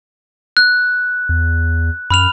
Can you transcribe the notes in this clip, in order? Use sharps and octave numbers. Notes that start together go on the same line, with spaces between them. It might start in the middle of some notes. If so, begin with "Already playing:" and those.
F#6
E2
F#2 B5 F6 F7